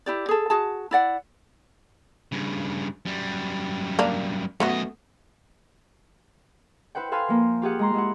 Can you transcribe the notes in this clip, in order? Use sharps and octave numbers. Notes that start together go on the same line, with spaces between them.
E4 G4 D5
G#4 A4
F#4 G#4 A5
E4 D5 F#5
G2 C#3
F#2 G3
A#3 D4
F#2 A3 B3 F#4 D#5
E4 B4 C5 F#5 G5
A4 B4 F5 G#5 C6
F3 A#3
F4 G4 G#4 F#5
G#3 A#5 C6
G#3 E4 F#5